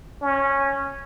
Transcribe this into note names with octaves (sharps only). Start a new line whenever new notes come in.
C#4